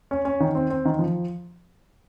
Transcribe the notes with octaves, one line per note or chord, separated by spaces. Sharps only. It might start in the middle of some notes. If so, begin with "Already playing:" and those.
C#4
C#4
D#3
C4
C4
D#3
F3